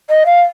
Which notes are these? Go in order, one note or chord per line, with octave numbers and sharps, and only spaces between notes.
D#5
F5